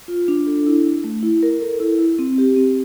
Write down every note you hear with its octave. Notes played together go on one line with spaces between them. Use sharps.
F4
D4
A4
E4
D4
A3
E4
A#4
A4
E4
E4
C4
G4
C4